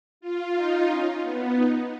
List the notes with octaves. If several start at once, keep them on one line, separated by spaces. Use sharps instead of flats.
F4
D#4
C#4
B3
D#4